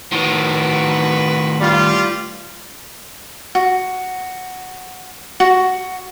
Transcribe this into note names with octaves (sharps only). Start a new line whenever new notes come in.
A2 D#3 F#4 B4
G3 F4
F#4
F#4